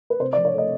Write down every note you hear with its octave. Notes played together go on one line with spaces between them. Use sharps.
B4
C3 C5
D5
F3
C#5
A3 D#5